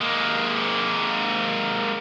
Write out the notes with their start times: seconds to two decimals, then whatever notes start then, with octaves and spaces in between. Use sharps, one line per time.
0.01 G#3 A#3